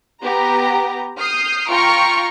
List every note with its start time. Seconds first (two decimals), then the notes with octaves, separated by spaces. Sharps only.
0.22 B3 G4 A#5
1.18 D#6 F6 G6 C7
1.69 F4 G5 A#5 C#6 F6 D7